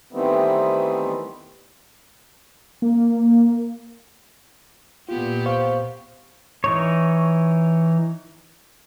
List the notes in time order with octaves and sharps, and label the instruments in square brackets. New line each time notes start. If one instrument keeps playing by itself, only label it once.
[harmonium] D#3 E3 G3 A3 B3 C4
[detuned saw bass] A#3
[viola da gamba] A#2 B3 G4 [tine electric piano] F4
[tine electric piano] C5 F5 C#6
[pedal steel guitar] E3 D#4 C#5